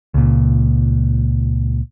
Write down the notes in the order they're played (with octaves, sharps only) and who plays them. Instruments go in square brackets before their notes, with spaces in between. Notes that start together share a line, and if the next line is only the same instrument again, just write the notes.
[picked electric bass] C#2 A#2